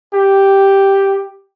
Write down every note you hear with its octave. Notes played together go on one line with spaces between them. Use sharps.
G4